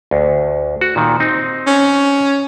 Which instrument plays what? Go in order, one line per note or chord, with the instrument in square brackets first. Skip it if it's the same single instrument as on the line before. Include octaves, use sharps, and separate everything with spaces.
[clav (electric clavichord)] D2
F#4
A#2 D#3
C4 D#4
[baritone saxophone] C#4